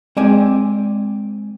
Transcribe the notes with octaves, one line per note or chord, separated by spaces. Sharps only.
G#3 C4 D5 G#5